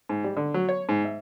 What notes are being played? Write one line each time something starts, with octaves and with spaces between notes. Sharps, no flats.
G#2
G3
D3
F#3
C#5
G#2
E5